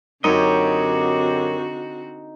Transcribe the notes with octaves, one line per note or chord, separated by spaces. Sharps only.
F#2 D3 C4 D#4 F#4 G4 C#5 D#5